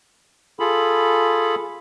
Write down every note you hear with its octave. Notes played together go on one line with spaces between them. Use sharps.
F4 G#4 A4 B5